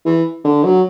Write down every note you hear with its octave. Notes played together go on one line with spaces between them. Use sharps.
E3
D3
F#3